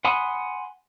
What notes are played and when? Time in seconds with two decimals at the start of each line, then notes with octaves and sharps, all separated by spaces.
0.05 F#5 G#5 B5 C6 D#6